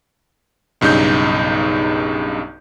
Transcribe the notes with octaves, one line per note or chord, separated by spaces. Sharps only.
B1 G2 C#3 D#4 G6